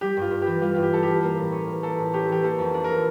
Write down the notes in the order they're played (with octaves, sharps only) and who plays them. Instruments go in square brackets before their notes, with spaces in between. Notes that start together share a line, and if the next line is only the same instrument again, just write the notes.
[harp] G3 [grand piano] G4
[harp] G2 [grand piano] F4
[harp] G2
[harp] E3 [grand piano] G4
[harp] G3 [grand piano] F4
[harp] G2 [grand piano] F4
[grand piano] G4
[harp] G2 [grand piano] A4
[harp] E3 [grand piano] G4
[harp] A#3
A2
C#4
E3
[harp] A#3 [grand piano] A4
[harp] A2
[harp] C#4 [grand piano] G4
[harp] E3 [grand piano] G4
[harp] A#3 [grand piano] A4
[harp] F2
D4
[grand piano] A#4
[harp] E3